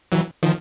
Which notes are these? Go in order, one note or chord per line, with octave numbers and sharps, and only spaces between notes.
E3 F#3
D#3 F3